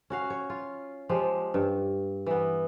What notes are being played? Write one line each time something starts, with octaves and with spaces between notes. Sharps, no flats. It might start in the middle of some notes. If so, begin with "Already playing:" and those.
C#4 F#4 F5
C#5
F4
F3 G#3 G4
G2
E3 B3